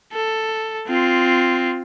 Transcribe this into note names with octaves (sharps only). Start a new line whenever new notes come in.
A4
C4 F4